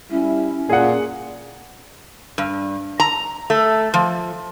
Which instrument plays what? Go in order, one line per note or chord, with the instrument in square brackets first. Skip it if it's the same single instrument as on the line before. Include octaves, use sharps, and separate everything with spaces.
[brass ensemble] G3 E4 [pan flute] C#4
[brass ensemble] A#2 [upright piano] G#4 F#5
[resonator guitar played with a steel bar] G2
A#5
A3
F3